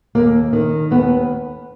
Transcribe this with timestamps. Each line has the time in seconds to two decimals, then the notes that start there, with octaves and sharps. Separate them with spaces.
0.15 D#2 A#3
0.53 D#3
0.91 D#2 B3